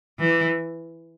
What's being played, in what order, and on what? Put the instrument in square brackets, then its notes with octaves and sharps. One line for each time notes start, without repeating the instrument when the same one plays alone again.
[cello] E3